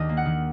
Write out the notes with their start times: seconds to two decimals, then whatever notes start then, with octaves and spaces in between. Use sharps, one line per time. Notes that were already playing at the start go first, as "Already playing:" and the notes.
Already playing: D#2 D#3 D4 D#5
0.09 A#3
0.17 F#5
0.26 D#3